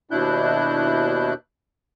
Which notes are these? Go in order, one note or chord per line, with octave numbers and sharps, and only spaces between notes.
D#2 B2 D4 E4 F#6 G6